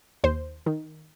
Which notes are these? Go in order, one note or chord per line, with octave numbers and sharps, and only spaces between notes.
D#2 C5
D#3